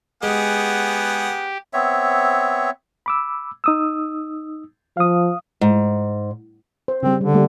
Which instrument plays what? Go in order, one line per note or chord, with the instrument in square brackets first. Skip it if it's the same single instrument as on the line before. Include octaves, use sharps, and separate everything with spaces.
[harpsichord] G#3 [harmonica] B3 G#4 F#5 [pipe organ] G4
[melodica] B3 C4 C#5 E5
[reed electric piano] B5 D6 E6
D#4 D#6 E6
[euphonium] F3 [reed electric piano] F5 D#6
[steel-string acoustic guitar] G#2
[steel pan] C5
[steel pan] C#3 G3 [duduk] C4
[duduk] D3 [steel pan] G3
[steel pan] G3 A3 A#3